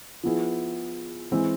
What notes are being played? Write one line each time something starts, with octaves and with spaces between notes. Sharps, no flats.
F3 B3 E4 G#4
E3 G#3 C4 E4